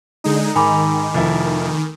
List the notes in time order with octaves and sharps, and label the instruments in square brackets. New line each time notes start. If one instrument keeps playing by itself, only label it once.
[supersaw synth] D3 G#3 D#4
[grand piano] G#2 [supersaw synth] D#3 [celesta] G#5 B5 D6
[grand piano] F1 F3 E4